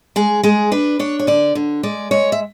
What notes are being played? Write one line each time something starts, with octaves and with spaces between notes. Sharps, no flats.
G#3 G#4
G#3 G#4
D4 B4
D4 C#5
C#5
D3 D5
D3
G#3 D5
G#3 C#5
E5